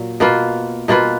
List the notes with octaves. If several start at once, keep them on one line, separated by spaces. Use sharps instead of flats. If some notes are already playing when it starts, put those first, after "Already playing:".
Already playing: A#2 F#3
B2 A#3 F4 B4
B2 A#3 F4 B4